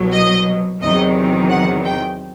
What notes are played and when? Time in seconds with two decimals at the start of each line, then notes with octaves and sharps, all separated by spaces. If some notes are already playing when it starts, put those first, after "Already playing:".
Already playing: C2 B2 F#3
0.12 D#5
0.81 E2 C3 D#3 F#3 D#5
1.50 F#5
1.84 G5